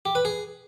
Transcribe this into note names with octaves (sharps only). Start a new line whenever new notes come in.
G4
B4
G#4